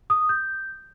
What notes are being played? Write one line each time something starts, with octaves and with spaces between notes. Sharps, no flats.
D#6
G6